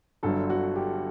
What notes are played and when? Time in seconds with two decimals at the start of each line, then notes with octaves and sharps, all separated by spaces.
0.23 G1 G2 D3 F#3 A4
0.50 F#4
0.76 G4